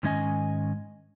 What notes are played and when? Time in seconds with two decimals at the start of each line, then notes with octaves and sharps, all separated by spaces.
0.03 G#2 D#3 G#3 C#4 D#5 G#5